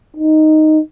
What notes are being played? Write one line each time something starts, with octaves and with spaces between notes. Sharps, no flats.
D#4